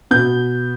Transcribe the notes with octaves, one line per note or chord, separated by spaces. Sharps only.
B2 B3 G6